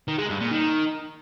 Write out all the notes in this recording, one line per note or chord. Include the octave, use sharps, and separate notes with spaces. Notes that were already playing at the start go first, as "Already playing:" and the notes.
D#3
G#3
G2
A#2
D#3